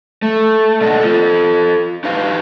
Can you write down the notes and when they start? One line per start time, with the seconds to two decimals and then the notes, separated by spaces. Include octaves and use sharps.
0.22 A3
0.81 B2 A#3 D4 A4 D#5 F#5
1.00 F4 A4
2.04 D#4 F#4 G4 B4 F5